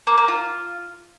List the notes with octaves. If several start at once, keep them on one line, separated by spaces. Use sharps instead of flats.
A#3
A#3
F4